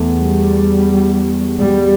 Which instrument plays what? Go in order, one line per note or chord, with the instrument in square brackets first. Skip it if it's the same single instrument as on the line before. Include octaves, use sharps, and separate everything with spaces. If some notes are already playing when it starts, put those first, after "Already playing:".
Already playing: [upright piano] E2 A3
[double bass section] G3
G3